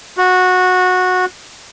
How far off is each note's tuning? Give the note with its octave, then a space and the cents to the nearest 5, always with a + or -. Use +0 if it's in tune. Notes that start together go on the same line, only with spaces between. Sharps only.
F#4 -15